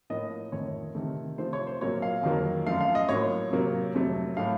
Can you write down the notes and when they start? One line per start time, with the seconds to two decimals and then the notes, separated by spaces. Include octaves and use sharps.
0.10 A2 F3 A#3 D#5
0.52 F2 D#3 A3 C#5
0.95 C3 D#3 A3
1.38 C3 F3 A3 C5
1.53 C#5
1.67 C5
1.81 A#2 F#3 A#3 C#5
2.02 F5
2.23 F2 D#3 F#3 A#3
2.67 F#2 F3 A3 F5
2.81 F5
2.95 D#5
3.09 A2 F#3 A#3 C#5
3.52 C3 F#3 A#3
3.95 F2 C3 F#3 A3
4.37 A2 A3 F5